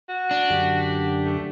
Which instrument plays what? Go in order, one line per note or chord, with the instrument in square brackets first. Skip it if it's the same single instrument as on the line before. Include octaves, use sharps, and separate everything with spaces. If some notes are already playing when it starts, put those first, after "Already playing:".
[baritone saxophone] F#4
[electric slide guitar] D4
[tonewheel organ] F#2 D3 G4
[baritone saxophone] A3